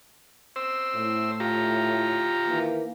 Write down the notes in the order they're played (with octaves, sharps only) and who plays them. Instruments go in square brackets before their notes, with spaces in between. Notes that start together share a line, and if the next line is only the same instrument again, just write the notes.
[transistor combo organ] C5 E6
[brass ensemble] A2
[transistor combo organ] F4 G4 A#5
[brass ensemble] D#3 E3 A#3